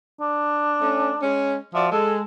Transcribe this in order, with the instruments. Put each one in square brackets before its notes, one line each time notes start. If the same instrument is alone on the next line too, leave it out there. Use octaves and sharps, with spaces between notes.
[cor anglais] D4
[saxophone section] A3 C#4
G#3 C#4
[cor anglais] F3 [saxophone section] F#4 D5 E5
[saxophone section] G#3 [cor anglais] A4